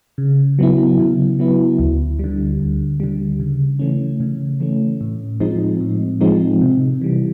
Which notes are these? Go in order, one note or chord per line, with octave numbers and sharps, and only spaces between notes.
C#3
F#3 B3 E4
C#3
F#3 B3 E4
D2
D3 G3
D2
D3 G3
C#3
E3 A3 C#4
C#3
E3 A3 C#4
A2
F3 G#3 C4 D#4
A2
F3 G#3 C4 D#4
C3
E3 G3